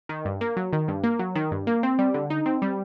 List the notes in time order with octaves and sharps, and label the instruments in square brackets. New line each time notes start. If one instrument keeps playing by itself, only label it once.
[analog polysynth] D#3
G2
A#3
F#3
D#3
G2
A#3
F#3
D#3
G2
A#3
C4
G3
D3
D#4
C4
G3